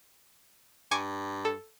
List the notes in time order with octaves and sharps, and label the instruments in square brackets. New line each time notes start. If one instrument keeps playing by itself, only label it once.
[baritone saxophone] G2 [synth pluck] G#5 C#6 D6
[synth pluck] A4